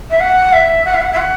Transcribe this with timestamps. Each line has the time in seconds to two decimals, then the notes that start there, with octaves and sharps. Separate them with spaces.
0.10 E5
0.20 F#5
0.53 E5
0.85 F#5
0.94 E5
1.02 F#5
1.13 E5
1.17 F#5